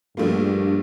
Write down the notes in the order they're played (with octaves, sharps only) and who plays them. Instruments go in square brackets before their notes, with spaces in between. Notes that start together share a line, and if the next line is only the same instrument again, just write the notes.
[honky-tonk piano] A#1 A3 A#3 [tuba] G2